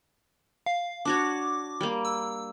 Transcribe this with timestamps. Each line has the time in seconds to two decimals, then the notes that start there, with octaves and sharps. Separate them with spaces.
0.66 F5
1.05 D4 F#4 C#5 D6
1.81 G3 A#3
2.05 E6